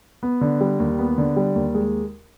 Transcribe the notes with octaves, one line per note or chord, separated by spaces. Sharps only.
B3
D3
G3
D#2
B3
D3
G3
D#2
G#3